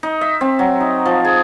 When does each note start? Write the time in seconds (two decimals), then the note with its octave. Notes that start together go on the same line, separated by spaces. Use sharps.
0.03 D#4
0.21 E5
0.41 C4
0.59 F#3
0.80 D#4
1.05 F3
1.25 G#4